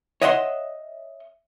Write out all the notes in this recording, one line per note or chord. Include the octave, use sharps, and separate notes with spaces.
C#5 D#5 E5 F#5 A#5 C6